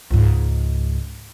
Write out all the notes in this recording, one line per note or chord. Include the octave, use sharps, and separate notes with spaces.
C#2 G#2